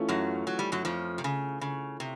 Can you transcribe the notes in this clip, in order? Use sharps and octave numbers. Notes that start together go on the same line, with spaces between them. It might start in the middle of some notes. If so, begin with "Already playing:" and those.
Already playing: E3 A3 C#4 F4
F#2 F#3
F#3
G3
F#2 F#3
F2 F3
C3
C#3
C#3
C3